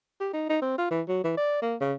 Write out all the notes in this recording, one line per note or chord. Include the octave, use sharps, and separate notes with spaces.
G4
D#4
D#4
C4
F4
E3
F#3
E3
D5
A#3
C#3